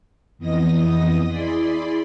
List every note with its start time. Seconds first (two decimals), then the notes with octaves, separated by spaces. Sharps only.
0.38 F2 E3 B3 D#5 D#6 A#6
1.27 E4 G#4 D5 B5 C6